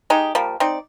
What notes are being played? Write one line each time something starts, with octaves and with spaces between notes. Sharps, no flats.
G#3 D#4 G4
F3 G3 A#3
C4 D#4 D5